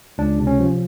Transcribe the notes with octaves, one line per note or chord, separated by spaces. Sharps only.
C#2 D4
C3
C#4
F3